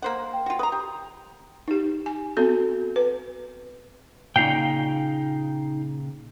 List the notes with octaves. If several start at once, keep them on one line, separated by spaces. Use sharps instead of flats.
A#3 C5 F#5
G5
F4 F#4
B4 A#5 D#6
G4
D#4 G4
G#5
B3 C4 F#4 A4
B4
A#2 C#3 D#4 F5 G5